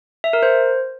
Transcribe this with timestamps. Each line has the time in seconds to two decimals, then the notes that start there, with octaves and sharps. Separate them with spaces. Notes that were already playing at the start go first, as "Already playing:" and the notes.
0.24 E5
0.33 A#4
0.43 C5